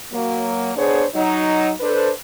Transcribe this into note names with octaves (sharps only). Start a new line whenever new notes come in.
F#3 A#3
B3 D4 G#4 C5 C#5
F#3 D#4
D4 A4 B4 C5